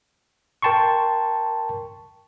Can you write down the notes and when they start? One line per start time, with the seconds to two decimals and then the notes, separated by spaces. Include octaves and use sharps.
0.62 A#4 G5 A5 C6 C#6